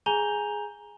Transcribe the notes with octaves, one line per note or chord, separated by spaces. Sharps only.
G#4 G#5 A#5 G6 F7 G7